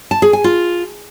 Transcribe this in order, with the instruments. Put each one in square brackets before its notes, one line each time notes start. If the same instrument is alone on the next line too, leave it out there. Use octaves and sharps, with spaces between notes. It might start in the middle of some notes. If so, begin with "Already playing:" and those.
[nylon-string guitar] A5
G#4
G#5
F4